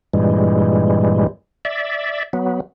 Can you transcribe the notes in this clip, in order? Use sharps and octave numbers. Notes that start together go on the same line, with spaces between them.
G2 A#2 E3 G3 G#3
D5 E5
F#3 B3